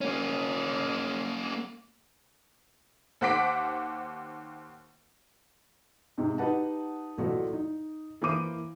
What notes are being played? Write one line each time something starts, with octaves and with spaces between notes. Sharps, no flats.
A#3 C#4
D#2 C5 F#5 D6 B6 D7
G#2 C3 D#4
D#4 G4 B4 F#5 A5
A1 A#2 F#3 A3 F#4
D#4
E3 A#3 E4 C5 D6 D#7